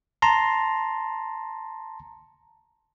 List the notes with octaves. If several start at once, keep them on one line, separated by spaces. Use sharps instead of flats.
A5 A#5 C6